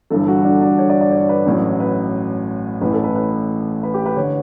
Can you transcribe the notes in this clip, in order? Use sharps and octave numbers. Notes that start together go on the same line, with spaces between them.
G1 G2 E3 G3 A4
F#4
D4
D4
C#5
D5
D5
C#5
B4
A1 A2 F#3
B4
A1 A2 E3 B4
A4
B4
B4
B4
G4
B4
D3 C#5